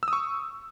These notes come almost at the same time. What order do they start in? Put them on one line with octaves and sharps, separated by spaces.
E6 D#6 C#6